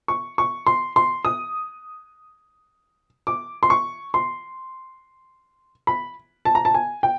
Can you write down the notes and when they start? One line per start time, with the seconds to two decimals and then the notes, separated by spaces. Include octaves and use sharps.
0.08 C#6
0.38 C#6
0.67 C6
0.96 C6
1.25 D#6
3.27 D6
3.63 C6
3.70 C#6
4.14 C6
5.87 B5
6.45 A5
6.55 A#5
6.65 A5
6.74 G#5
7.03 G5